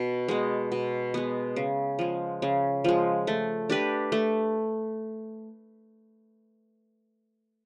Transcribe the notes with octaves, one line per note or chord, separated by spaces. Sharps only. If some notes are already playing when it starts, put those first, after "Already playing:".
Already playing: B2
G#3 B3
B2
G#3 B3
C#3
F3 G#3
C#3
F3 G#3
A3
D4 G4 B4
A3